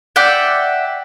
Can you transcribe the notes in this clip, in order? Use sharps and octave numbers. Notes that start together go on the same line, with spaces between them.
D5 E5 F#5 G5